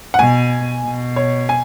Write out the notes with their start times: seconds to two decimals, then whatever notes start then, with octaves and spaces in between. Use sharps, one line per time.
0.14 F#5
0.18 B2 G#5
0.84 B2
1.16 C#5
1.49 G#5